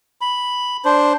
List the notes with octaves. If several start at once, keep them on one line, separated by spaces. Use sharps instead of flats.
B5
D4 C5